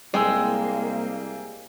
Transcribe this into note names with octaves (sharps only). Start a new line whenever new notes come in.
C2 G#3 A#3 G5 G#5 E6